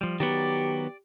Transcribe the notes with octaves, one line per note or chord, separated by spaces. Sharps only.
F3 G3
D#3 F#3 B3 G4 D5